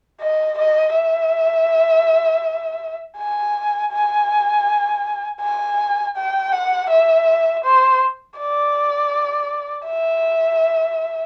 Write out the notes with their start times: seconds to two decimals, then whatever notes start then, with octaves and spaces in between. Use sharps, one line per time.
0.21 D#5
0.58 D#5
0.95 E5
3.18 G#5
3.92 G#5
5.41 G#5
6.16 G5
6.52 F#5
6.90 E5
7.64 C5
8.39 D5
9.87 E5